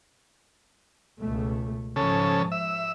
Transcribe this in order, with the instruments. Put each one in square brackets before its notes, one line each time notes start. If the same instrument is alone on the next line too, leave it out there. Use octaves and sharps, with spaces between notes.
[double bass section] C#2 B2 A3
[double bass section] G#2 F3 [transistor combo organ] C#3 A4
[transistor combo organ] E5